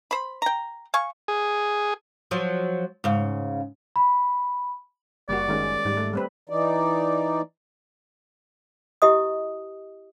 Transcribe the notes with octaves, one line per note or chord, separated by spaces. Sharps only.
C5 B5
G5 A#5
F5 G#5 C#6
G#4
F3 F#3
G#2 C#3
B5
F#1 G3 A#3 F#4 D5
D#3 G#3 C#4
G#2 G3
A3
G3 C4 B4
E3 D#4 D5
E4 G4 D#5 D#6